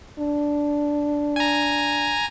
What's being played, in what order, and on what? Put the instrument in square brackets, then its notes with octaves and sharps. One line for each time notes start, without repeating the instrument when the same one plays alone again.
[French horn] D4
[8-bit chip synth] G#5 A#5